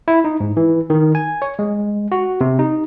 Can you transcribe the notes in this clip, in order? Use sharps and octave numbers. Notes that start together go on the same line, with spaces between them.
E4
D#4
G#2
E3
D#3
G#5
C#5
G#3
F#4
C3
D#4